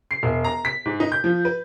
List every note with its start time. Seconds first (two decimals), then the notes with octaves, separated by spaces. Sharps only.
0.11 C7
0.23 E1
0.44 A#5
0.65 B6
0.86 G#2
1.00 D#4
1.12 G6
1.24 F3
1.45 B4